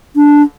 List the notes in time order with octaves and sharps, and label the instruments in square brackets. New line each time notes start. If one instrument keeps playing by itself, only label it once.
[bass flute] D4